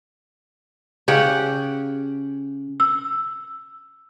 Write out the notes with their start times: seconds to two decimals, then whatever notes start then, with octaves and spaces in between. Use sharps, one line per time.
1.08 C#3 G4 F#5
2.80 E6